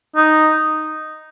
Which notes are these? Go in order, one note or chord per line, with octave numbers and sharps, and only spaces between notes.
D#4